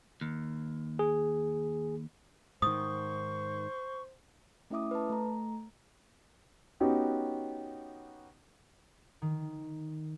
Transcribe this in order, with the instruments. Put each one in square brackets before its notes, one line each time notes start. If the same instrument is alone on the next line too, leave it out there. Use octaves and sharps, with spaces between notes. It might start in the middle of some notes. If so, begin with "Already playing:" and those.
[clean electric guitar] D#2
[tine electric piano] G#4
[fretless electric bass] G#2 D#3 [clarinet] C5 [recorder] C#6 [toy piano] D#6
[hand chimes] A3 C#4 E4 E5 D6 D#6
B4 A5
A3 A#5
[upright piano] B3 C#4 D#4 F#4 G4
[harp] D#3